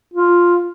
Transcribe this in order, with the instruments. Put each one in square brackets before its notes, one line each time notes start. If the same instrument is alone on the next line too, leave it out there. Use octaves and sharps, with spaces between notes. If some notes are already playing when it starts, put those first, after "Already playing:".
[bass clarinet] F4